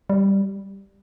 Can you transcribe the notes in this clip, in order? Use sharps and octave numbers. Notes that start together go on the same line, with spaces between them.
G3